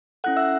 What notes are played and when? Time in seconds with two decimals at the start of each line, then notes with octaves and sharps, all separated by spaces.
0.24 C#4 E4 A4 F#5 F#6
0.36 E5 E6